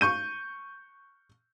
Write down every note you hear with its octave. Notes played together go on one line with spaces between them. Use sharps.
C#6 G6 D#7